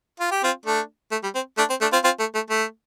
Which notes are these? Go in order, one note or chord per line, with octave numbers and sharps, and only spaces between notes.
F4
G4
C4 F4
A3 D4
A3
G3
C4
A3 D4
C4
A3 D4
C4 F4
C4 F4
A3
A3
A3